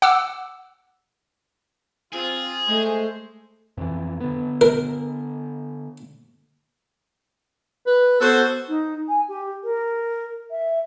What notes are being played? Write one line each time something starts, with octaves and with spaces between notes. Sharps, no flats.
F#5 D6 E6
C4 F4 G#4
G#3 A3 C5
F2 E3
D3 B3
A#4
B4
B3 F#4 A4 C5
D#4
G#5
G4
A#4
E5